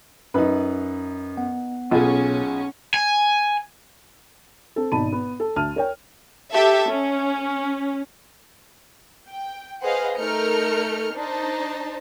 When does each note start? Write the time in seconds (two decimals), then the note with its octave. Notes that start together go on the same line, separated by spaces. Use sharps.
0.34 F#2 D#4 B4
1.37 B3 F#5
1.91 B1 B2 B3 C#4 F4 G#4
2.94 G#5
4.76 C4 A4
4.92 G#1 B2 D#4 A5 B5 D#7
5.12 B3
5.40 A4
5.56 D2 A5 F6 D#7
5.76 A#4 C#5 G5
6.53 G4 A4 E5
6.89 C#4
9.28 G5
9.82 G#4 B4 C5 D#5 F5 F#5
10.17 A3 D#4 A#4 F6 G6 C#7
11.15 D4 D#4 C5 A5